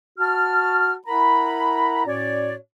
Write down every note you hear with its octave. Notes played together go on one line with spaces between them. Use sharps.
F#4 A5 F6
E4 A#4 F#5 A#5 B5
A2 C#4 F#4 C#5 D5